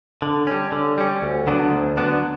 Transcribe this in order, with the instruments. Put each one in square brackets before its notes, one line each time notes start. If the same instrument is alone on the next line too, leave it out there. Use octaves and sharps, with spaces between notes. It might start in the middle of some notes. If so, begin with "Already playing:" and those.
[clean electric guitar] D3
G3 C#4
D3
G3 C#4
D2
D3 F#3 B3 D4
D2
D3 F#3 B3 D4